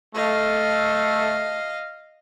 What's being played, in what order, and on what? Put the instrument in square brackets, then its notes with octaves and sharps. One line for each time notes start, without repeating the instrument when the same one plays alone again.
[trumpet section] A3 [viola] D#5 F5